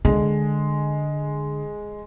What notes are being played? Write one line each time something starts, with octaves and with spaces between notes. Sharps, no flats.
D3 G#3